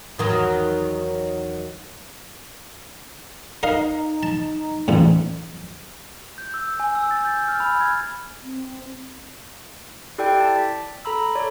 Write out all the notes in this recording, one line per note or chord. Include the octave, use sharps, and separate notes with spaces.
E2 D#3 F#3
D#4 A#4 D#5 F5
A5
A1 G#2
G6
E6
G#5
E6
A6
G6
F6
B5
G#6
C4
E4 G4 A4 D5 G5
A5
B6
A4 A#5 B5 E6
A4 C#5 D5